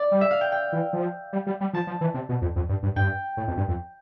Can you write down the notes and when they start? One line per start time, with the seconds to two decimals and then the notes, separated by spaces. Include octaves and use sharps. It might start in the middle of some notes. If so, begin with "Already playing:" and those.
Already playing: D5
0.11 G3
0.21 E5
0.31 F5
0.41 G5
0.52 G5
0.72 E3
0.93 F3
1.33 G3
1.47 G3
1.61 G3
1.73 F3 A5
1.87 F3
2.01 E3
2.14 C3
2.29 B2
2.42 F2
2.56 F2
2.69 G2
2.83 G2
2.96 G2 G5
3.37 A2
3.48 F2
3.57 G2
3.68 F2